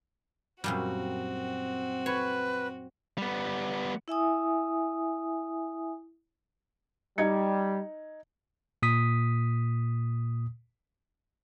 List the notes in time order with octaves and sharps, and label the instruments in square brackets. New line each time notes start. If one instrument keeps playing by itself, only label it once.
[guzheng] F#2 A#2 G3 [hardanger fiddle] C4 F#4
[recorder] B4 [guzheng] C#5
[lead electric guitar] G3 B3
[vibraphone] E4 E5 G#5 D#6
[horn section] G3 [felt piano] D#4 G#6 C#7
[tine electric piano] A#2 D#6 B6